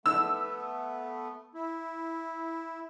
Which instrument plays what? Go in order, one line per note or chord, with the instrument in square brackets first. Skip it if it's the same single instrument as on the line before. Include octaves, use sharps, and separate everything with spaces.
[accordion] A3 B3 [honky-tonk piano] E6
[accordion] E4